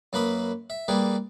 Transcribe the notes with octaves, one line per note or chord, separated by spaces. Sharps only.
F#2 A#3 B4 B5 D#6
E5
G3 A#3 G#4 B4